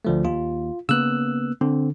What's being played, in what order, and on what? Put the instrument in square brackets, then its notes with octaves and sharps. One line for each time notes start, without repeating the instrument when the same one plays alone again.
[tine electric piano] D2 F3 A3
[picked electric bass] D#2 [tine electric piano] F4
[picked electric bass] C#3 A#3 B3 [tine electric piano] E6 F#6
[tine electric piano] D3 [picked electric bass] C4